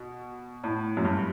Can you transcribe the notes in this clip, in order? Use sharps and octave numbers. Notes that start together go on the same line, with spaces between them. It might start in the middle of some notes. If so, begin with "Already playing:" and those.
Already playing: B2
A2
F#2
G2